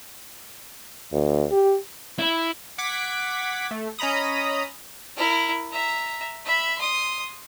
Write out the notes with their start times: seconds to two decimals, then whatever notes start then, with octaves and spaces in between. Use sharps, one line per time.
1.12 D2
1.51 G4
2.19 E4
2.78 F#5 D6 G#6 B6
3.71 A3
3.99 C#4 D#5 A#5 B5 D#6
5.17 E4 A#4
5.72 E5 A#5
6.45 E5 B5
6.78 C6 D#6